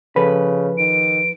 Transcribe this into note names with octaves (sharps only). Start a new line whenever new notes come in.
C#3 F3 A4 B4 B5
D#3 D7